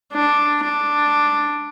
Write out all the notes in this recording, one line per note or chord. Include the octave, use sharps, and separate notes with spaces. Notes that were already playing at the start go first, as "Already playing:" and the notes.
D4
D4